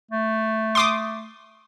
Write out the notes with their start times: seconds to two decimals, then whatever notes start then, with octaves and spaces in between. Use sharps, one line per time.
0.11 A3
0.75 C6 D6 D#6